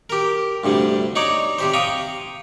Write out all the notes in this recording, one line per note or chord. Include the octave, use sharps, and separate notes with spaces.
G4 A#4
D2 G2 C3 G3
D#4 C#5 D5 A#5
C3 G4 C5
F5 G5 A#5 C#6 D#6